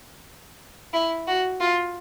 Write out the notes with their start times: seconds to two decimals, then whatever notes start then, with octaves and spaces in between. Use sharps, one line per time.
0.93 E4
1.27 F#4
1.60 F4